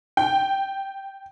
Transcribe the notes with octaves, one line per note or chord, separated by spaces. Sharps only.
G5